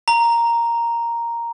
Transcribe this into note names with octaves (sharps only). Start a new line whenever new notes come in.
A#5